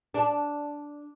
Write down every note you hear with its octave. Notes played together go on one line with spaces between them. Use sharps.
D4